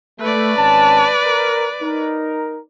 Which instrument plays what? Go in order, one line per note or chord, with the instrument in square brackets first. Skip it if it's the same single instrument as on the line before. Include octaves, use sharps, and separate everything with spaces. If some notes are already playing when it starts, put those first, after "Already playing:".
[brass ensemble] A3 [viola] B4 D5
[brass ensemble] G#1 C#4 A5
A#4
D#4 A#4